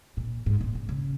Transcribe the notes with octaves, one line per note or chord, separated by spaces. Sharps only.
A#2
G#2
A#2
A#2
C#3